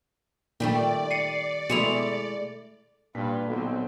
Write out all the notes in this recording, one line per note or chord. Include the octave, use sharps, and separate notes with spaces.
A#2 D#3 G3 A3 D5
C7 C#7 D#7
B2 G#3 A3 E4 C#7 F7
G2 A#2 F4 B4 B6
B1 D3 B3 C4